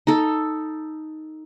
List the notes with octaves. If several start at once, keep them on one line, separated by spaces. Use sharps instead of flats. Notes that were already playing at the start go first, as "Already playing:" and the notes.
D#4 A4